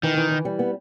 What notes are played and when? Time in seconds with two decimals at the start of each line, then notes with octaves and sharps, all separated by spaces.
0.03 D#3 E3
0.17 E3
0.31 E3
0.45 G3
0.59 B3